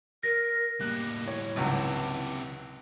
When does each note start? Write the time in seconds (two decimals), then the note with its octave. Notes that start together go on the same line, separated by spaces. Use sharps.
0.23 A#4 A#6
0.81 A2 G3 A#3 F#6
1.28 E4 C#5
1.56 G#1 C#2 C3 F#3 B4